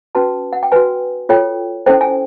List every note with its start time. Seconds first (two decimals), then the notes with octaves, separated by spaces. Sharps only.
0.15 C#4 F#4 B4 A5
0.53 F#5
0.63 G5
0.72 F#4 B4 G#5
1.29 F4 A4 C#5 G5
1.86 C#4 E4 A4 C5 G5
2.01 G#5